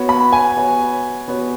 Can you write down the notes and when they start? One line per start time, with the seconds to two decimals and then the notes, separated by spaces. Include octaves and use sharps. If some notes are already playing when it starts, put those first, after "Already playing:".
Already playing: B3 F#4 C#5
0.09 B5
0.33 G#5
0.56 B3 F#4 C#5
1.28 B3 F#4 C#5